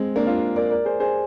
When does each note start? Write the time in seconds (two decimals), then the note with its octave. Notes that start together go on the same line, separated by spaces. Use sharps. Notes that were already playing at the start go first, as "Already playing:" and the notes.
Already playing: G#3 C4
0.16 A#3 D4
0.27 D4 F4
0.56 A#4 D5
0.70 A#4 D5
0.85 G#4 C5
1.00 G#4 C5